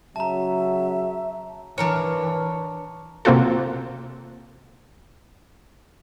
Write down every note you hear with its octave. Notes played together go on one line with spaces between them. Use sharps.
C#3 F#3 E5 A5 A#5
E3 D4 A#4 C#5
C3 A#3 C4 F4 F#4 A4